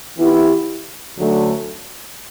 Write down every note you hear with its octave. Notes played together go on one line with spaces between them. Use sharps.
E3 B3 E4 G4
D2 D3 F#3 A3 C#4